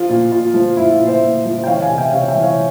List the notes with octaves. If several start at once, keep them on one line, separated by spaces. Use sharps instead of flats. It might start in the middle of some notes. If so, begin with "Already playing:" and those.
Already playing: F3 F4
A#2
A#2 F4
F3
F3 E4
F4
A#2
C5 E5
A#2
F3
G5
E3 C#5 F5
F5 G#5
C3
E5 G5
C3 C#5 F5
E5 G5
E3
C#5 F5